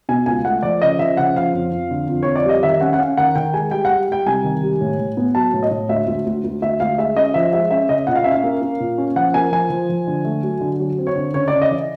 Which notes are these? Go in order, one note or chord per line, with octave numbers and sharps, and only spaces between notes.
B2 G#5
C#2 G#5
A3 F#5
F3 D5
C#3 D#5
F3 E5
C#3 F#5
F3 F5
F2
F2
D3
F2
F2 C#5
D5
G3 D#5
D#3 E5
C#4 F#5
F#5
C#4 F5
D#3 F#5
D#3 G5
G#3 G#5
G3 G5
F#5
G3
G3 G5
C2 G#5
D#3
G3
A2
A2
B3
F#3 A5
A2
D#5
A2
D2 E5
D2
D2
D2
D2 E5
D2 F5
G#3 E5
C#4 D#5
F3 E5
G#3 E5
C#4 E5
C#3 D#5
A#2 F#5
F5
C#4 E5
F5
A#3
A#3
A#2
C#4
F3 F#5
A#3 G#5
F3 G#5
F3
F3
D3
A3
F#3
D3
F#3
C4
C#5
D3
C#3 C#5
C#3 D5
D#5
E3